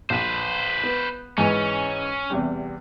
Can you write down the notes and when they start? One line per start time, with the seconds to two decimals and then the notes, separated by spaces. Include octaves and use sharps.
0.10 A#1 B4 C5
0.83 B3
1.38 G#2 E3 G#3 C#4
2.30 E2 C3 G3